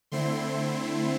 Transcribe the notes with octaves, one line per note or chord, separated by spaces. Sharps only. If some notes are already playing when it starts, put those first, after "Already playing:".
D3 A3 C4 E4 C6
C6
C6